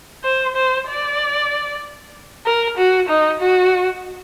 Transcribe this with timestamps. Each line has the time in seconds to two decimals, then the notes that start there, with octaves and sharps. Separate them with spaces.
0.24 C5
0.56 C5
0.88 D5
2.46 A#4
2.77 F#4
3.09 D#4
3.41 F#4